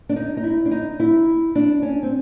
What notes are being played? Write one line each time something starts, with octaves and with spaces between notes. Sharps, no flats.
D4
D#4
D#4
E4
D4
D#4
E4
D4
C#4
C4